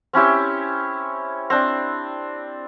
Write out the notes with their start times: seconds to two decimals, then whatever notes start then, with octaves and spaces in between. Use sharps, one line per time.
0.13 C4 C#4 E4 G4
1.50 C4 D4